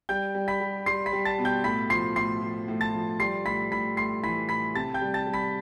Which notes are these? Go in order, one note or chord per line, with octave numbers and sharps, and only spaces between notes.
G3 G5 G6
G3
B5 B6
G3
G3 C6 C7
B5 B6
G3
A5 A6
B2
G5 G6
A2 B5 B6
F3 C6 C7
A2 C6 C7
F3
A2
A5 A6
F3
G3 C6 C7
A2 B5 B6
A2 B5 B6
A2 C6 C7
E3 B5 B6
A2 B5 B6
C3 A5 A6
G5 G6
G3
A5 A6
G3
B5 B6